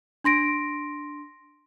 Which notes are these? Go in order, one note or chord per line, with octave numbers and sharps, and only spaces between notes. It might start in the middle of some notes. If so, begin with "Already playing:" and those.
D4 C6 A#6 D7